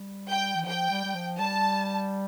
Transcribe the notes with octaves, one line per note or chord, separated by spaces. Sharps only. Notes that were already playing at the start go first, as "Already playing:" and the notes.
Already playing: G3
G5
E3
F3 G5
G3
G3
F3
G3 A5